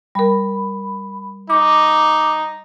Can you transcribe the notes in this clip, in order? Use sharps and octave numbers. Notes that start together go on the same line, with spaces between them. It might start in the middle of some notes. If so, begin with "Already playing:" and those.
G3 A#4 B5
D#4 D6